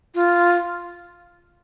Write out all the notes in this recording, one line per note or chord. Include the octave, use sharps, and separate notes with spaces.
F4